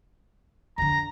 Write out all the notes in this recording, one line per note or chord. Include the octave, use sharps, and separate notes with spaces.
F2 D3 A#5